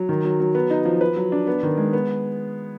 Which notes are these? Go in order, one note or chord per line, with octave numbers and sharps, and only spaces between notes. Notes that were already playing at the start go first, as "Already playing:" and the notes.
Already playing: F#3
D#3
F#3
F#3
B3
D#4
F3
B4
F#3
D4
B3
D#3
G#3
B3